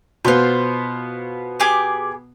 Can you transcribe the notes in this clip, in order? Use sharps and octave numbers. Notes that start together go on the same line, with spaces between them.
B2 B3 F4 C5
G4 G#4 D6